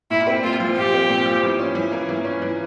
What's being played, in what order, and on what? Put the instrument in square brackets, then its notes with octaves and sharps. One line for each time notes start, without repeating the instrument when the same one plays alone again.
[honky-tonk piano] A#2 [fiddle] E4
[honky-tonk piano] C4
[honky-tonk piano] A#2 [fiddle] F4
[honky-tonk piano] F3
[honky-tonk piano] A#2 [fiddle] G4
[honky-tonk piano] C4
A#2
F3
E3
C#4
E3
A#3
E3
C#4
E3